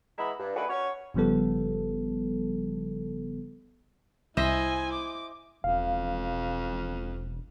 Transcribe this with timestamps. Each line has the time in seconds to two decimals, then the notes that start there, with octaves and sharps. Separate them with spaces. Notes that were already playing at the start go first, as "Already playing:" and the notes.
0.18 E3 G#3 B3 E5 A#5 B5
0.40 G2
0.55 D#3 A3 D4 F#4 G#4 B4
0.69 C#4 F#4 C#5
1.14 G1 C#3 F3 G3 B3 A4
4.37 C2 E4 C5 D#5 E5 G#5
4.93 D6
5.64 E1 F2 F5